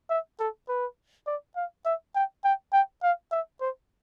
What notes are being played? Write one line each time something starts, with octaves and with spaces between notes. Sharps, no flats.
E5
A4
B4
D5
F5
E5
G5
G5
G5
F5
E5
C5